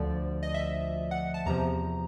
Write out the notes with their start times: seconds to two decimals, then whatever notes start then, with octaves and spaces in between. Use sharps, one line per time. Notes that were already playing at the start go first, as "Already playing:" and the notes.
Already playing: D2 D3 F3 D5
0.43 D#5
0.54 E5
1.11 F#5
1.34 A5
1.46 E2 C3 F3 A#5